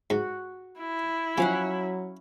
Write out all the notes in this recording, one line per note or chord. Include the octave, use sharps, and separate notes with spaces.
G#2 F#4
E4
F3 F#3 C#4 F5 F#5